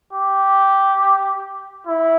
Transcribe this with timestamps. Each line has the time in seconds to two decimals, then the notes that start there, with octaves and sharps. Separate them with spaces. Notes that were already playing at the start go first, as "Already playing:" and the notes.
0.13 G4
1.87 E4